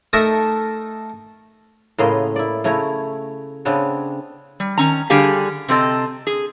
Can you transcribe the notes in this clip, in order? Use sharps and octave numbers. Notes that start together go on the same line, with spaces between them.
A3 D#4 A4 A#4 E5
A2 C#3 A#3 B3 D#5 C6
E4 D5
C#3 A3 E4 C#5 A#5
C#3 B3 C4 D4 C#5
G3
D#3 C#4 A#5
D3 G3 G4 G#4 F5 G#5
C3 C4 A4 D#5
G#4